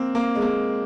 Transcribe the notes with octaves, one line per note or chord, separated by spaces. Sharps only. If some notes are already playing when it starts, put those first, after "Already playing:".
Already playing: A#3 C4
A#3
G#3
A#3